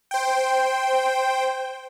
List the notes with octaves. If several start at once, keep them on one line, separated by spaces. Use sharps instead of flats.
C5 G5